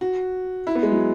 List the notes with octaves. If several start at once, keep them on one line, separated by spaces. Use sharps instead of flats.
F#4
E4
B3
G#3
F#3